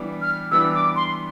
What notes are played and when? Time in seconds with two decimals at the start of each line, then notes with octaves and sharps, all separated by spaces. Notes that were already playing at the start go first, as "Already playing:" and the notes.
Already playing: E3 G3 B3 D4
0.22 F6
0.51 E3 G3 B3 D4 E6
0.74 D6
0.96 C6